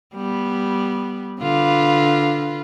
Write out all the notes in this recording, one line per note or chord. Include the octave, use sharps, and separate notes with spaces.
G3 B3
D3 F4 B4